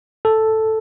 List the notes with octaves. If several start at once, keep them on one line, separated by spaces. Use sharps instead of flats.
A4